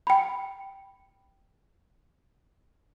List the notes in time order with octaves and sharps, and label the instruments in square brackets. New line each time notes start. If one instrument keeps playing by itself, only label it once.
[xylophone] G5 B5